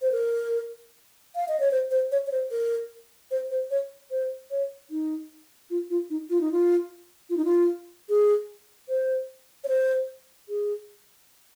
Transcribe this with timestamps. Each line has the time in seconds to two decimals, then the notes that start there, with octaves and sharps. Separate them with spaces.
0.02 C5
0.12 A#4
1.36 F5
1.48 D#5
1.60 C#5
1.71 C5
1.91 C5
2.12 C#5
2.27 C#5
2.31 C5
2.51 A#4
3.31 C5
3.51 C5
3.71 C#5
4.11 C5
4.51 C#5
4.90 D#4
5.70 F4
5.90 F4
6.10 D#4
6.30 F4
6.41 D#4
6.52 F4
7.30 F4
7.37 D#4
7.45 F4
8.09 G#4
8.89 C5
9.64 C#5
9.68 C5
10.49 G#4